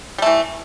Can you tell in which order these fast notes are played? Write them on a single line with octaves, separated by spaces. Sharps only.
G3 A3 E3